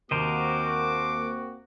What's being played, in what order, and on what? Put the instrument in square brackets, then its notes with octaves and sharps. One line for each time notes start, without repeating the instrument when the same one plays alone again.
[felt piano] D#2 [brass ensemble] A#3 C4 F#4 [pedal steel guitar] A#4 C5 D#5 [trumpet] D6